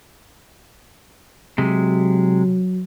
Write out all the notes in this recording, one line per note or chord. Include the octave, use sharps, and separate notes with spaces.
C3 F#3 G#3